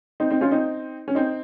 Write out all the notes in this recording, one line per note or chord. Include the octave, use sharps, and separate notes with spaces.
C4 D#4
C4 D#4
C#4 F4
C4 D#4
C#4
C4 D#4